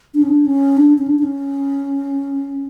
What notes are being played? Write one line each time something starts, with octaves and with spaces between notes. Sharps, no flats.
D4
C#4
D4
C#4
D4
C#4
D4
D4
C#4